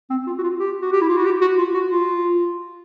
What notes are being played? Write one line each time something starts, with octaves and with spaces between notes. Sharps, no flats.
C4
F4
F#4
F4
G4
F#4
G4
E4
F4
F#4
G4
F#4
F4
F#4
F4